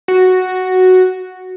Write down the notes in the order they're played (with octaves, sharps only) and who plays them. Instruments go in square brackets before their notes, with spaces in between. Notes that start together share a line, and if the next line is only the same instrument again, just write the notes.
[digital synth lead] F#4